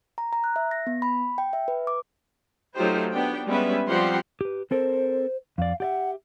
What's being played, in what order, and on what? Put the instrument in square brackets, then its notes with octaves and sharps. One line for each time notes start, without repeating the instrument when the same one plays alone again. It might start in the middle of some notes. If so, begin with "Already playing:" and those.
[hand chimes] A#5
A#5
F#6
E5
A#6
B3
B5
G5
E5
B4
D6
[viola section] F#3 A3 D#4 F4 G4 C5
B3 D4 G4 G5
G3 G#3 B3 C#4 B4 E5
F3 G3 C4 G4 F#5 C6
[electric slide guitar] G4 B4
[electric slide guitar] C4 A4 A#4 [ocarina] C5
[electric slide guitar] F2 D5 [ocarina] F5
[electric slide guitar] G4 D5 E5 [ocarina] F#5